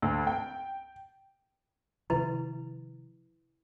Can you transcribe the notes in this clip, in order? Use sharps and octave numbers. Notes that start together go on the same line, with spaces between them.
D2
G5
C3 D#3 F3 E4 B4